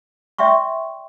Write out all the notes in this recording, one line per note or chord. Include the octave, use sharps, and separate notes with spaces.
D5 E5 G5 C6 C#6